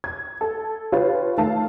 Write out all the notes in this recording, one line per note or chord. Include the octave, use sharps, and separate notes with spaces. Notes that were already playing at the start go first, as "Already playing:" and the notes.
G#6
A4
F4 G4 B4 C#5
D#3 A3 F5 A5